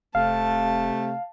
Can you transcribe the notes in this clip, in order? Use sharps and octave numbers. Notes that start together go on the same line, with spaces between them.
F1 C3 A3 F5 A5